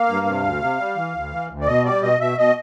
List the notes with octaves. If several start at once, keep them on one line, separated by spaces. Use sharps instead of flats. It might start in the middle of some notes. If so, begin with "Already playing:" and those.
Already playing: A#3 F5
G2
C3
D2
C3
G3
E3
D2
E3
D2
D5
B2 D#5
G3 D5
B2 D#5
B2 E5
B2 D#5